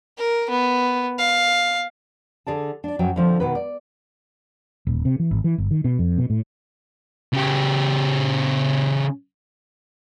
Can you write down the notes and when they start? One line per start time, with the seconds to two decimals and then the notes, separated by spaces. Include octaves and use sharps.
0.18 A#4
0.50 B3
1.19 F5
2.47 D3 G#4 D5 A5
2.84 D4 D5
2.99 F#2 F#3 G5
3.16 D3 F3 C4
3.40 B2 D#3 B4
3.55 D5
4.87 D#1
5.05 C3
5.19 E3
5.31 G#1
5.44 E3
5.58 G1
5.71 D#3
5.85 B2
5.99 F2
6.18 B2
6.30 A2
7.33 C#3 G4